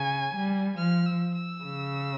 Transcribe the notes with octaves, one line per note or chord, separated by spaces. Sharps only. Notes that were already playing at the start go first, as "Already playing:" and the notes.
Already playing: C#3 G#5
G3
F3 F6
E6
E6
C#3